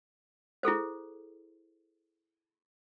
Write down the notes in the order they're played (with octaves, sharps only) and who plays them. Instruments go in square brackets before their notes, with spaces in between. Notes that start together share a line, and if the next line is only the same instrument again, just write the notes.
[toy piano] E4 G#4 A4 C5